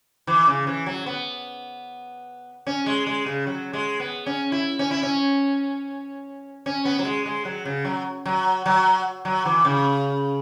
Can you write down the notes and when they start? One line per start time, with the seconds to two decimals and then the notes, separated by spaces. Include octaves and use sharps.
0.27 E3
0.47 C#3
0.67 E3
0.86 F#3
1.06 B3
2.67 C#4
2.86 G#3
3.06 G#3
3.26 C#3
3.47 F#3
3.73 G#3
4.00 B3
4.26 C#4
4.52 E4
4.79 C#4
4.91 E4
5.03 C#4
6.66 C#4
6.85 B3
6.99 F#3
7.05 G#3
7.26 G#3
7.45 F#3
7.65 C#3
7.85 F#3
8.25 F#3
8.66 F#3
9.25 F#3
9.45 E3
9.65 C#3